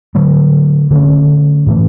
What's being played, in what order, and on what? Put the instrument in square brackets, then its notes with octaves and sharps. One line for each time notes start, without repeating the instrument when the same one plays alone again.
[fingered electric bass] D3 F#3 A3
D3 A3 C#4
A2 E3 A3 C#4